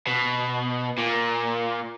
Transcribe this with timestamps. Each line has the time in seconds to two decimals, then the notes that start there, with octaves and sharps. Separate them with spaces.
0.07 B2
0.98 A#2